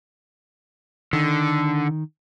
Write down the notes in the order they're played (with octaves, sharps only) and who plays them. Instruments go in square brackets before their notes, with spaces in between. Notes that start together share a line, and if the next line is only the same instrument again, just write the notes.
[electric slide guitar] D3 [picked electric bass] D#3